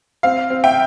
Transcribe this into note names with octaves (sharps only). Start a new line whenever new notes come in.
C4 F5
C4
E5 G5